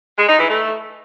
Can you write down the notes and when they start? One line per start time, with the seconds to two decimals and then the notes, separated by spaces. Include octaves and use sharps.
0.17 G#3
0.28 D#4
0.38 E3
0.49 A3